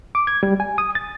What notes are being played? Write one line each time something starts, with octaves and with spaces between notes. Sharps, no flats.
D6
G#6
G3
G#5
D#6
A6